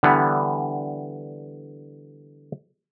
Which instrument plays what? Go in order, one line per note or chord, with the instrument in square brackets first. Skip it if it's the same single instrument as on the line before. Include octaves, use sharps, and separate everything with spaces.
[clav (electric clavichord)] D3 E3 G3 B3